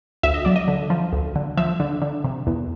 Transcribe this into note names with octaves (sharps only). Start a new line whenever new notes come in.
D2 E5
D#5
F#3 D5
D#5
D3
F3
D2
D3
F3 E5
D3
D3
C3
E2